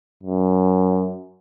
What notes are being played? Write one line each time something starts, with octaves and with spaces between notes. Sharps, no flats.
F#2